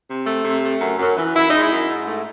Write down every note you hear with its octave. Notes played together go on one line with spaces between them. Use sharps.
C3
A3
C3
A3
F#2
F#2
E3
F#2 E4
D#4
G#3
E4
F#2
G#2
A3